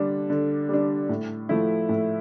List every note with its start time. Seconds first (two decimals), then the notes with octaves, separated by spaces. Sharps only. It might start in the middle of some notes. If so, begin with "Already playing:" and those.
Already playing: D3 G3 D4
0.30 D3
0.69 G3 D4
1.09 A2
1.49 F3 A3 E4
1.89 A2